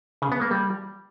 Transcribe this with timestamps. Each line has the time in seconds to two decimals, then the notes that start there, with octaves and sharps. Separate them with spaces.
0.22 C#3
0.32 B3
0.41 A#3
0.51 G3